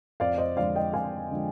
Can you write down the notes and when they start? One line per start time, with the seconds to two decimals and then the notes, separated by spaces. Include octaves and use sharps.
0.20 F2 D5 F5
0.38 C5 D#5
0.57 D3 F3 G#3 D5 F5
0.75 D#5 G5
0.93 F2 F5 G#5
1.31 D3 F3 G#3